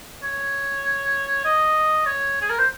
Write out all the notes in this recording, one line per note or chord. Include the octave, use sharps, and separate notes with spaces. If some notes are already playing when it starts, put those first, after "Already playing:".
C#5
D#5
C#5
G#4
A#4
C5